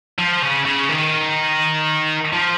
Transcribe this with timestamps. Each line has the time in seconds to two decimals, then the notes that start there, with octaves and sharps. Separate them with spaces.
0.19 F3
0.42 C#3
0.66 C#3
0.89 D#3
2.33 F3